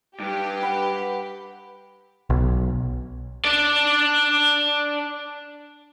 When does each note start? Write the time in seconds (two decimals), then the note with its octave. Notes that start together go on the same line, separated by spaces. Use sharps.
0.20 G2 G4
0.62 B4 F#5
2.30 B1
3.45 D4 D5